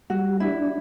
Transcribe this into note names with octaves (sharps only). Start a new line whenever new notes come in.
G3 F#4
D4 E4